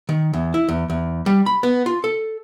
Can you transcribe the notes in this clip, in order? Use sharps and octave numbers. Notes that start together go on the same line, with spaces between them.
D#3
E2
E4
E2
E2
G3
B5
B3
F4
A4